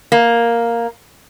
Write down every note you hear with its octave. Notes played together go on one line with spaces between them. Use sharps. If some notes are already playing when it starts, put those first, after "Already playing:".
A#3